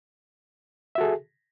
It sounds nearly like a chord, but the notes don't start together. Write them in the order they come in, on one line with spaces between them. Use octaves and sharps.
E5 F#4 A4 G#4